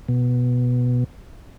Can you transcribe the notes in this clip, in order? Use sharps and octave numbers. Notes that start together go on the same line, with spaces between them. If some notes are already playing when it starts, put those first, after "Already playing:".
B2